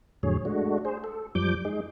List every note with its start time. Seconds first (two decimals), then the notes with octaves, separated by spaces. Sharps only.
0.23 F2 A2 D3 F#3 G#4 C#5
0.45 G#3 A3 D4 F#4
0.85 G#4 C5
1.04 A4
1.35 F#2 F3 G3 D6 G6
1.65 G#3 D#4 G#4